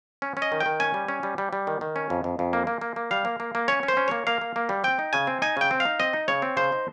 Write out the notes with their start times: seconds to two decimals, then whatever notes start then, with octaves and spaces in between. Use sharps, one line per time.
0.22 C#4
0.37 C#4
0.42 D#5
0.52 D#3
0.60 G5
0.66 D#3
0.80 C#4 G#5
0.94 G3
1.08 C#4
1.23 G3
1.38 G3
1.53 G3
1.67 D#3
1.81 D#3
1.96 C#4
2.10 F2
2.24 F2
2.39 F2
2.53 A#3
2.67 A#3
2.81 A#3
2.96 A#3
3.11 G3 F5
3.25 A#3
3.40 A#3
3.55 A#3
3.68 C#4 C#5
3.83 C#4
3.88 C5
3.97 C#4
4.08 A#3 C#5
4.27 A#3 F5
4.41 A#3
4.56 A#3
4.69 G3
4.84 C4 G5
4.99 D#4
5.13 C#3 G#5
5.27 C4
5.42 D#4 G#5
5.57 C#3 G5
5.71 C4
5.80 F5
5.85 D#4
6.00 C4 D#5
6.13 D#4
6.28 C#3 C#5
6.42 C4
6.57 C#3 C5
6.72 D#4